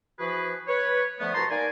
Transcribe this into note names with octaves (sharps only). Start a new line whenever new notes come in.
E3 F3 F#4 G#4 B4
B4 C#5
D3 F3 A3 B3
C2 F#4 B4 A5 A#5 C6
A#3 D#4 D5 G#5